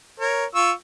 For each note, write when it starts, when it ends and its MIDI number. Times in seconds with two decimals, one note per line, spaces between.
0.20 0.45 70
0.20 0.45 73
0.55 0.72 65
0.55 0.72 85
0.55 0.72 88